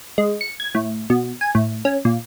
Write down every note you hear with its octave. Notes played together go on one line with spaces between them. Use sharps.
G#3
C#7
G#6
A2
B2
G#5
A2
C#4
A#2